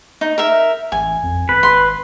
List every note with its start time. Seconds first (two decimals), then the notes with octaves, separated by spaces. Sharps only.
0.21 D#4
0.38 A#4 E5
0.92 A1 G#5
1.23 F2
1.49 G#1 B4
1.63 C6